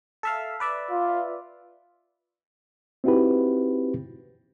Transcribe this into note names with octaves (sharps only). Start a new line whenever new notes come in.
A4 E5 F5
B4 D5 E5
F4
C4 D#4 E4 F#4 G4 B4